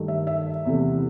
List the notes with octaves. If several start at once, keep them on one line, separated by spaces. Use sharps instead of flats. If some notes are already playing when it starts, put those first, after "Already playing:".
Already playing: G2 D#3 A3
E5
E5
E2 C3 E3 A3